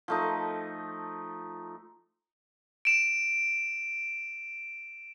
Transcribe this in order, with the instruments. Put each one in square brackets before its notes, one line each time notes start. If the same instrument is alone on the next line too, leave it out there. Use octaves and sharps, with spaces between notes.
[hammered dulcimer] F3 A3 D#4
[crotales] D7 E7